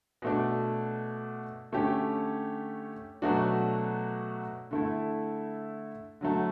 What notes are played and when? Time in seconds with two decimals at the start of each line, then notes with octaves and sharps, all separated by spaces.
0.22 B2 A3 D4
1.72 D3 A3 C#4 G4
3.22 B2 F#3 A3 D4 F#4
4.71 D3 A3 E4
6.21 D3 F#3 A3